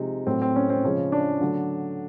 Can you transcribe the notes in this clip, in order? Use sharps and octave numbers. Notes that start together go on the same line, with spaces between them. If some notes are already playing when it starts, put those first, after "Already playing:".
Already playing: C3 F3 G#3 D#4
A2 F#3 A3 C4
C4
C#4
C4
C#3 F3 G#3 C#4
D4
D3 F#3 A3